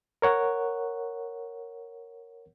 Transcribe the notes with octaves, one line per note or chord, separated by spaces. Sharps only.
A#4 C#5 F#5